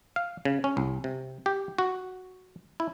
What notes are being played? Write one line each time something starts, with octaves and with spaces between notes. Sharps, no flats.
F5
C#3
C#4
C2
C3
G4
F#4
E4